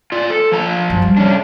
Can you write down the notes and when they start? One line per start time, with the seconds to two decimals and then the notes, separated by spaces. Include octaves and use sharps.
0.12 F4 D5
0.30 A4
0.52 F3 A5 A#5
0.90 F#2
1.02 G3
1.17 C3 C#4 D4